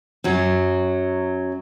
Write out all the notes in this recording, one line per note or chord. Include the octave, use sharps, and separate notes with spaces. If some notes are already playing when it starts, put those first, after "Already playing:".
F#2 F#3